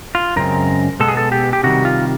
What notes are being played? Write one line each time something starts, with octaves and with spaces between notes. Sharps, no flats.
F4
F#2 C#3 G#3 C4 A#4
B2 G#3 B3 A4
G#4
A4
G4
G4
C3 D#3 G3 F#4
F4